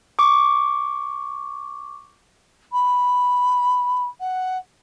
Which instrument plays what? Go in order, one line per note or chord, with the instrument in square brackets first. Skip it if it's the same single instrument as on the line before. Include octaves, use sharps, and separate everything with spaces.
[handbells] C#6 D6
[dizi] B5
F#5